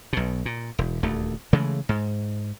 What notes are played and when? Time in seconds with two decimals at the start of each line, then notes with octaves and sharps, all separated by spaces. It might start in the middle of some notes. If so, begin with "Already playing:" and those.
0.13 B1 B2
0.46 A#2
0.79 E1
1.03 D#1 D2 A3
1.53 C#3 E3 G#3 A3
1.89 G#2